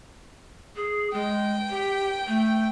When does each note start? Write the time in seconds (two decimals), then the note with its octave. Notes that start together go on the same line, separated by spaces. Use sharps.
0.76 G#4
1.13 G#3 G5
1.70 G4
2.27 A3